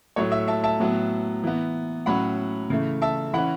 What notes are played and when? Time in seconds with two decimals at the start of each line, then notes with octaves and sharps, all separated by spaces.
0.16 A2 F#3 A3 C#5
0.32 E5
0.48 E5 A5
0.64 E5 A5
0.80 A2 F#3 B3
1.43 E3 B3
2.06 A2 F#3 C#4 F#5 B5
2.70 C#3 E3 A3
3.02 E5 A5
3.34 E3 C#4 F#5 B5